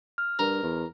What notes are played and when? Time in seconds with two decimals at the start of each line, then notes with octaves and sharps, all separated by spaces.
0.18 F6
0.39 G2 A#4
0.63 E2